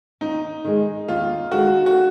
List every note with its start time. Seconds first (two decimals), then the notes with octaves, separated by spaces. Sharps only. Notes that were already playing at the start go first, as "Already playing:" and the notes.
0.21 D#2 D#4
0.65 D#3 G#3
1.08 D#2 F4
1.52 D#3 G#3 F#4
1.86 F#4